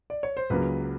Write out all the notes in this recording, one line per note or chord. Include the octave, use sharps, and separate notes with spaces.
D5
C#5
C5
C#2 C#3 F#3 A#3 B4